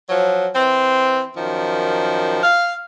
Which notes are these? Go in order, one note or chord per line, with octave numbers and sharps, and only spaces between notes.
F3 F#3
E3 C4
F#2 D#3 F3
F5